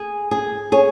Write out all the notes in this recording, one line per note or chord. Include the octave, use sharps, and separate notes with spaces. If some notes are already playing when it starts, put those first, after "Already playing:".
Already playing: G#4
G#4
G#4 C#5